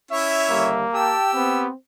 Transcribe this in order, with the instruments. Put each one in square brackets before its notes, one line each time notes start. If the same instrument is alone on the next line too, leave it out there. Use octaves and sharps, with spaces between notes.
[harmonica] C#4 E4 C#5 [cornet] E5
[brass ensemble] D#2 D3 G3 [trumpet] A#3
[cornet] G4 [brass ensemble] G5 A5 [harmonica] E6
[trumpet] B3 [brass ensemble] C4